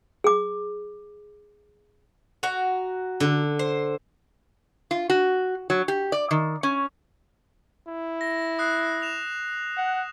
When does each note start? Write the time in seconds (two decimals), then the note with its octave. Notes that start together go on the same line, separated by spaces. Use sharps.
0.24 G#4 D6
2.43 F#4 A#5
3.20 D3
3.59 C5
4.91 F4
5.10 F#4
5.70 F#3
5.88 G4
6.12 D5
6.31 D#3
6.63 C#4
7.87 E4
8.21 A#6
8.59 D#6 F#6 C7
9.02 E7 F7
9.77 F#5